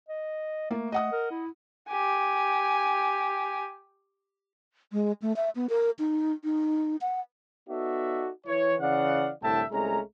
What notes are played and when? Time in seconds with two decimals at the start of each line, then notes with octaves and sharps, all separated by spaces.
0.09 D#5
0.71 A3 A#3
0.92 D#5 F#5 D#6
1.12 A#4
1.31 E4
1.89 G4 G#5
4.92 G#3
5.22 A3
5.36 E5
5.55 B3
5.70 A#4
5.99 D#4
6.44 D#4
7.01 F#5
7.69 B3 D#4 F#4 A4 D5 E5
8.47 E3 C#5
8.80 C#3 E3 D5 F5 F#5
9.42 C2 A2 D3 E5 G5 A5
9.72 C2 G#3 A3 C#4 A#5